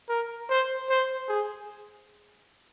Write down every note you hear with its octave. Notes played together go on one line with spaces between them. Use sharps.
A#4
C5
C5
G#4